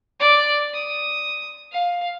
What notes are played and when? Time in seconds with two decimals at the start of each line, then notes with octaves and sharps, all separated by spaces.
0.20 D5
0.74 D#6
1.72 F5